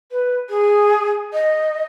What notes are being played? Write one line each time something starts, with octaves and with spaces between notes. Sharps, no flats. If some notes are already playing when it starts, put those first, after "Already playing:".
B4
G#4
D#5